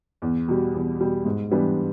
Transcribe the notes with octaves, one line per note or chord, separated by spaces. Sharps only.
E2
B2 G3
E2
B2 G3
G#2
E3 G3 B3 D4